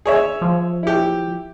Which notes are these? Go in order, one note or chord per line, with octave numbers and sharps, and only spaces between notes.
G#4 C#5 E5
F3
E4 G4